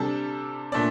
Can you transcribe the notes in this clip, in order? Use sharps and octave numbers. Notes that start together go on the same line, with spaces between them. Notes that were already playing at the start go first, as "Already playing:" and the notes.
Already playing: C3 G3 D4 A4
A#2 A3 D4 A4 D5